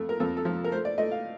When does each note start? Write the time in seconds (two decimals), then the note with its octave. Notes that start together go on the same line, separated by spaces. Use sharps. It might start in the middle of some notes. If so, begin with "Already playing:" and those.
Already playing: F2 A3
0.09 A#4
0.20 F2 A4
0.37 A4
0.45 F3
0.64 A#4
0.72 A3 C5
0.85 D5
0.98 A3 D#5
1.11 F5